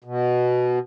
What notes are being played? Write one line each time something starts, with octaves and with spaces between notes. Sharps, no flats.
B2